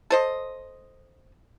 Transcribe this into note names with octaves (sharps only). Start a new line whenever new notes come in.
A4 C5 D#5